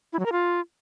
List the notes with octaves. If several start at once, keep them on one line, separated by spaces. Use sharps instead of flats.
E4
F#3
A#4
F4